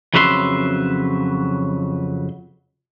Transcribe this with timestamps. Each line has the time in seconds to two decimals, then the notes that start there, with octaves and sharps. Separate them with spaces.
0.14 F2 C#3 F#3 B4 E5 C6